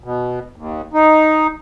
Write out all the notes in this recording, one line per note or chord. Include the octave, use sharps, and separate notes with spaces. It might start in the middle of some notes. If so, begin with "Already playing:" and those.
B2
D#2
D#4